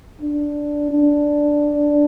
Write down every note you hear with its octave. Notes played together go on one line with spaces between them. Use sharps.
D4
D4